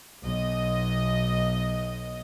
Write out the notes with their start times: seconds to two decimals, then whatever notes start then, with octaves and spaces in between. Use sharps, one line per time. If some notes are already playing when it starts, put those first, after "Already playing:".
0.24 B1 D#5